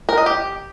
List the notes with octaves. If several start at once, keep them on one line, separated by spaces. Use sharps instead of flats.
A#4
D#5
G4